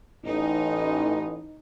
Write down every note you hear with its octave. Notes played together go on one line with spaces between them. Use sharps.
A1 D#4